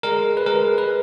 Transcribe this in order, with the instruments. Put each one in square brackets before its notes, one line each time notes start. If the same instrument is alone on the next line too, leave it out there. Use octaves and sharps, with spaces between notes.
[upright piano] G#3 [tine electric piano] A#4
[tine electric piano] B4
[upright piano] G#3 [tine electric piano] A#4
[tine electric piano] B4